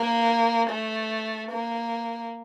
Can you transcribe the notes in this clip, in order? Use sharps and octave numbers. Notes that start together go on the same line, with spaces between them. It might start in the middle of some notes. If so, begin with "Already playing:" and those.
Already playing: A#3
A3
A#3